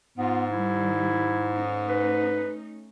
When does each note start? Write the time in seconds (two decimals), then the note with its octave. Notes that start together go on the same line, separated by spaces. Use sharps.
0.18 G#2 B3 F4
0.51 D#3 G3 E4
1.53 A3 C#4 D#4
1.89 B4